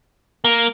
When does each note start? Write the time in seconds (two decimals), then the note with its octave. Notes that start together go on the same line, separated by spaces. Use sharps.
0.44 A#3